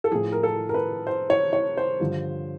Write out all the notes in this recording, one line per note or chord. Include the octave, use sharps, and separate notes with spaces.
A4
A2 F3 G#4
A#4
A4
A#4
B4
C5
C#5
C#5
C5
G2 D3 F3